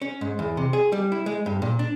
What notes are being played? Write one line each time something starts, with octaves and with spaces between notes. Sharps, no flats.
C#4
G#2
E2
C3
G#4
G3
E4
G#3
G2
A#2
D4